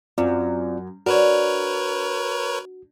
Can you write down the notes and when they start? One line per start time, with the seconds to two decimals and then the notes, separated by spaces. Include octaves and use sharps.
0.18 F#2 C4 F4 D5
1.06 D4 F#4 A#4 B4 C#5